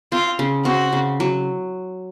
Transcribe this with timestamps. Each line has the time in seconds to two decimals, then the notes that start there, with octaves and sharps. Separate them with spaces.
0.12 C4 F4
0.39 C#3
0.65 C4 F#4
0.93 C#3
1.20 F#3